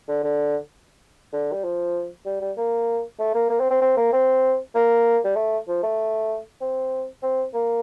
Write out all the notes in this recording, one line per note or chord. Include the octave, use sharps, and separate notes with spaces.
D3
D3
D3
G3
F3
G3
G3
A#3
A3
A#3
A#3
C4
C4
C4
A#3
C4
A#3
G3
A3
F3
A3
C4
C4
A#3